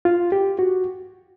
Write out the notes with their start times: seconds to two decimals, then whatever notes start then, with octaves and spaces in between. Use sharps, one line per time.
0.05 F4
0.32 G4
0.59 F#4